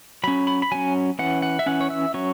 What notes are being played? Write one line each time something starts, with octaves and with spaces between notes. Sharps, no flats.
F#3 C#4 B5
B5
B5
F#3 C#4 G#5
E3 C#4 F#5
F#5
E5
E3 C#4 F#5
C#5
E5
F#3 C#4 C#5